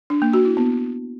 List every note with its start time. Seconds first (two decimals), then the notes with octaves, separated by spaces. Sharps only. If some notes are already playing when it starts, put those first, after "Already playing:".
0.10 D4
0.22 A#3
0.33 F#4
0.45 E4
0.57 B3